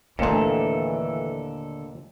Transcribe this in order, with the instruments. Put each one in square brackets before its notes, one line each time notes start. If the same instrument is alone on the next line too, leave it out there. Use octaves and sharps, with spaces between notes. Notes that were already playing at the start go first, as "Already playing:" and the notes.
[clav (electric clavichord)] D#2 A#2 [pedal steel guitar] D3 A4 [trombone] E3 [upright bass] A3 D4